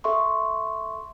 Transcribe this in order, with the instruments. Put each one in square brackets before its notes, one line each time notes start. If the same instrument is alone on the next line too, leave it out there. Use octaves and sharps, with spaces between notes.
[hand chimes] A4 E5 C6 C#6